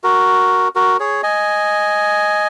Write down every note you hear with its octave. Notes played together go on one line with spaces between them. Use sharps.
F#4 A#4
F#4 A#4
G#4 C#5
D#5 G#5